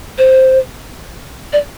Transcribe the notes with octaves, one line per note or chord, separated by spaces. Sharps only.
C5
D5